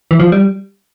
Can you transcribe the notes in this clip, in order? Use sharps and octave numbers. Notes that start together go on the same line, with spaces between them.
E3
F3
G3